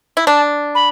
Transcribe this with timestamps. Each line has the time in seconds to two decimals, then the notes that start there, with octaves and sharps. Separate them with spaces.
0.17 E4
0.26 D4 A5
0.75 B5